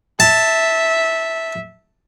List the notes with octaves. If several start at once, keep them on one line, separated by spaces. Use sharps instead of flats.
E5 A5